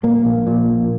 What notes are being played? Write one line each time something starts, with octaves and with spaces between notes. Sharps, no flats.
A#2 A#3
A#1
A#2
A#1